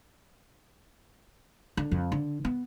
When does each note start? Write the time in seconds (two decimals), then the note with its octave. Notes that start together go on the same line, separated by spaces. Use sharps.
1.77 D3
1.91 F2
2.12 D3
2.45 B3